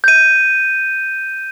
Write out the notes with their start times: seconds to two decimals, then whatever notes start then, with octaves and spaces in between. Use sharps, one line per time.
0.04 G6 D#7